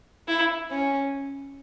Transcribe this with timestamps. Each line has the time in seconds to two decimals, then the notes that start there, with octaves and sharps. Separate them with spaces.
0.28 E4
0.71 C#4